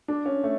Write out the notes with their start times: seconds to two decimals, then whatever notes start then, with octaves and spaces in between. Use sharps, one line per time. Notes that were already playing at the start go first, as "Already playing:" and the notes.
0.08 D4
0.26 C#4
0.44 A3